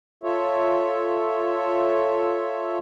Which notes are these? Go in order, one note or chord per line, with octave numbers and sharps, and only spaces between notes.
F4 A4 C#5 E5